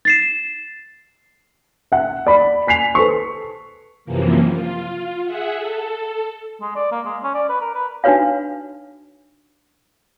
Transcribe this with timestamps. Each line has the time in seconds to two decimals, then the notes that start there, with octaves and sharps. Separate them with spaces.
0.05 A6 C7 E7
1.92 E5 F#5
2.27 D5 B5
2.67 G#5 B6 C7 F7
2.95 A4 B4 C5 C#6
4.05 F#2 C3 E3 F3 A#3
4.51 F4
5.24 G#4 E5 F#5
5.57 A4
6.61 G#3
6.76 D5
6.91 A#3
7.06 G#3
7.23 C#4
7.34 D5
7.49 B4
7.61 A#4
7.75 B4
8.04 D4 D#4 F#4 B4 C#5 F5